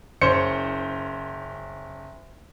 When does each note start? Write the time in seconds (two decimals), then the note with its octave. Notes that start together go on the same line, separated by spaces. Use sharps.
0.21 F#1 C#4 C5 C#7